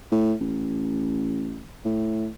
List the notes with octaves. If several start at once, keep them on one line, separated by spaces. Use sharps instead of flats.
A2
A1
A2